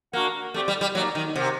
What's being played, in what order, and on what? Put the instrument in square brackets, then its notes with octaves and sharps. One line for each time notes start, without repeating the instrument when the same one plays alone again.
[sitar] A#3 [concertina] D4 F#4 A#4 F#5
[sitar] A3 [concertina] C4 G4 D5 G5
[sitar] G3
G3
[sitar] F#3 [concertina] A#3 D#4 G4 D5
[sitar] D#3
[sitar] C3 [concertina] G4 A#4 F#5